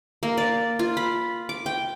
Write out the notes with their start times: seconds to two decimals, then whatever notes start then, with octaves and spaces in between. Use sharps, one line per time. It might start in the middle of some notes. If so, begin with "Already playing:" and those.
0.23 A#3
0.37 D5
0.79 F4
0.97 B5
1.49 D6
1.66 G5